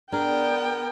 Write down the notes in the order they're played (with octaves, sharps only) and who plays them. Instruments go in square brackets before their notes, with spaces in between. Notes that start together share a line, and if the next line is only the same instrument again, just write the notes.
[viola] B3 G5 [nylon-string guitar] D4 G#4 [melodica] A#4